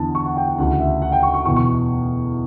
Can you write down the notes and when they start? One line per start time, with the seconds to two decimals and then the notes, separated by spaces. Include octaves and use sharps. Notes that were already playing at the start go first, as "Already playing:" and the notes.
Already playing: E2 D3 A5
0.15 C#6
0.26 F#5
0.37 G5
0.48 F#5
0.58 D2 C#3 E3 F#5
0.80 E5
1.02 F#5
1.12 G5
1.23 C#6
1.34 C#6
1.45 E2 C#6
1.49 B2
1.56 C#6